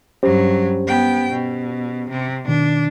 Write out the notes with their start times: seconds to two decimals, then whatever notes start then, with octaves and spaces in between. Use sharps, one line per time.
0.23 G2 F#3 C#4 G4 C5
0.87 B3 G5
1.32 B2
2.10 C3
2.48 B2 D#3 D4